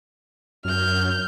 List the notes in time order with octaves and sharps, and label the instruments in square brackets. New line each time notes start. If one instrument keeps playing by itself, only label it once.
[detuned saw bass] F#2 [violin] F6 G6